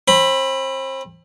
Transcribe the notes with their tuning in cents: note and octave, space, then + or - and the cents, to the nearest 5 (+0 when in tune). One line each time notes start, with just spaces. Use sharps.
C4 +35 B5 +0